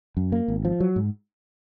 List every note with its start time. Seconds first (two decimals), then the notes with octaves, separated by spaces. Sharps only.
0.17 F#2
0.32 A#3
0.48 G#1
0.65 F3
0.80 F#3
0.96 G#2